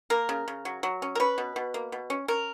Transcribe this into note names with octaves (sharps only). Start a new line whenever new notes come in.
A#3 A#4
C#3
C#3
F#3
F#3
C#4
A#4
C#4 B4
B2
B2
A#3
B2
C#4
C#4 A#4